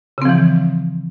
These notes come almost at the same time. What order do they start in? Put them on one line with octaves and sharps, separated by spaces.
C#3 C4 F3 E3